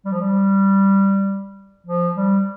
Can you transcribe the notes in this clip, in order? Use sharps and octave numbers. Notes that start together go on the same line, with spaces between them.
G3
F3
G3
F3
G3